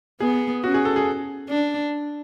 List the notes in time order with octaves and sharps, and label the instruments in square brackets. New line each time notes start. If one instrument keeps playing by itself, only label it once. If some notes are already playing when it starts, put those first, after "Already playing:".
[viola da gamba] B3 [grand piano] G#4
[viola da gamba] C#4 [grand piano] F#4
[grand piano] G#4
A4
G#4
[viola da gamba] D4